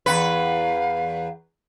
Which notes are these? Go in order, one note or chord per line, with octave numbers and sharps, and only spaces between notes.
E2 C3 B4 F5